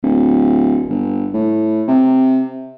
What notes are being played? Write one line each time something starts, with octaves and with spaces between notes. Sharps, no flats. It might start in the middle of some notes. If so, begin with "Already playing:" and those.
D1
G1
A2
C3